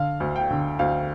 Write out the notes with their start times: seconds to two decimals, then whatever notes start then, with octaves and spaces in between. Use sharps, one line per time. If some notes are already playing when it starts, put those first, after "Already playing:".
Already playing: D3 F5
0.20 D2
0.36 G5
0.51 D3
0.79 D2 F5